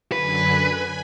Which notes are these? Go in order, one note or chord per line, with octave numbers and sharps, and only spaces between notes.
F#2 D3 B4 G#5
G#5 B5